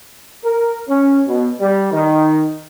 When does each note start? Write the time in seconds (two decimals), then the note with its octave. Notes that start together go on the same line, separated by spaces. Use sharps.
0.45 A#4
0.88 C#4
1.27 B2
1.60 G3
1.92 D#3